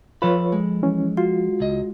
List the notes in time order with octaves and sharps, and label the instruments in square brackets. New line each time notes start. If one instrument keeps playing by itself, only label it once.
[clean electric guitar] F3 A4 B5 [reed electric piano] F4 B4 C#5
[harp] G#3
[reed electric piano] E3 C#4
[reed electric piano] F4 [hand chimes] F#4
[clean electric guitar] C#2 D#5